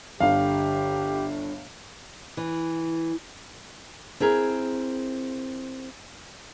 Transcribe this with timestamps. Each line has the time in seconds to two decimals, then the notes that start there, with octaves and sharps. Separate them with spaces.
0.20 G1 D3 G4 F5
2.37 E3
4.20 C4 E4 G#4 A#4